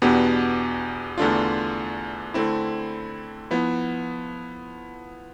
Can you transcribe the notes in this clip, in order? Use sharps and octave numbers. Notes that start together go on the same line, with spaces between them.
E2 B2 B3 D4 G4
E2 D3 A3 D4 F4
D3 A3 C4 E4
F3 B3 E4